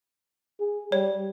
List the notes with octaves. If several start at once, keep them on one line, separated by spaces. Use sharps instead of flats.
G#4
G3 C#5